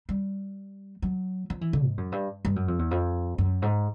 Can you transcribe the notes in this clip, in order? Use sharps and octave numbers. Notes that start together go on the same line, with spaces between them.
G3
F#3
F3
E3
D3
G#2
F#2
G2
G2
F#2
F2
E2
F2
F#2
G#2